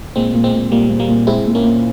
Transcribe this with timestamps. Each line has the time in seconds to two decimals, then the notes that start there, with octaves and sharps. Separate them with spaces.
0.16 A#2 G#3 C4
0.34 A#2
0.44 G#3 C4
0.53 A#2
0.71 A#2 G3 A#3
0.90 A#2
1.00 G3 A#3
1.08 A#2
1.27 G#3 C4 E4
1.46 A#2
1.55 A#3 C#4
1.64 A#2